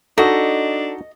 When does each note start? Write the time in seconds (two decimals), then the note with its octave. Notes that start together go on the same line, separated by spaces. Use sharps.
0.18 D4 D#4 F#4 A4 D#5